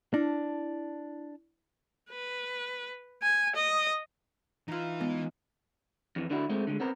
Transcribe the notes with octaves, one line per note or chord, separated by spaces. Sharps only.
D4 E4
B4
G#5
D#5
E3 D#4 F4 B4
G#3 B3
F2 E3
D3 D4 E4 F#4
G#3 A3 C4
D3 G#3
B3 C4 A#4